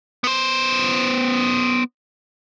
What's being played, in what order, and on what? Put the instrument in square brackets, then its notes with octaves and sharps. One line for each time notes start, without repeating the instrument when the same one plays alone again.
[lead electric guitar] B3 C5